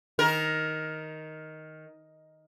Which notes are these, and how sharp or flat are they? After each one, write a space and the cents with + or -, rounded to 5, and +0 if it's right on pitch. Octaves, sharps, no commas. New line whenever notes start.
D#3 +5 A#4 +10